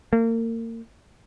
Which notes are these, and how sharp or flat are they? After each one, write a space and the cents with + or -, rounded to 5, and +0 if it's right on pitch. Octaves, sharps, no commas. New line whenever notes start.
A#3 -35